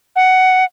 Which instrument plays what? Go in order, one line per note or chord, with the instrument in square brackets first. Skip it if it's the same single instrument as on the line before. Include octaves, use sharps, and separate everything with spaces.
[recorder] F#5